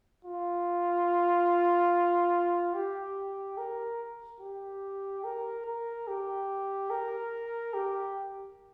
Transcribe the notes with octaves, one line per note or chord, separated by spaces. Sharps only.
F4
G4
A#4
G4
A#4
A#4
G4
A#4
G4